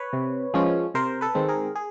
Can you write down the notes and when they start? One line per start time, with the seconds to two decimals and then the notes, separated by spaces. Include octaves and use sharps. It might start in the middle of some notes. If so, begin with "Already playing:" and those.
Already playing: B4 C#5
0.13 C3
0.54 F3 G#3 C#4
0.94 C3 A#4 C5
1.21 A4 B4
1.35 D#3 G#3 C4
1.48 G#4 A#4
1.75 G#4